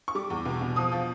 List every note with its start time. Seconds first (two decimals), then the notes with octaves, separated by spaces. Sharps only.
0.08 C#6
0.15 G3 D6
0.30 E2
0.45 B2
0.61 B2
0.76 F3 D#6
0.92 F3